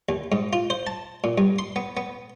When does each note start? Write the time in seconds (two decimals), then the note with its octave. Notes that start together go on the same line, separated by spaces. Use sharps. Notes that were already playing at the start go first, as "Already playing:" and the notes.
0.09 D#2
0.32 G#2
0.53 F4
0.70 C5
0.87 A5
1.24 A#2
1.38 G2
1.59 C6
1.76 B3
1.97 B3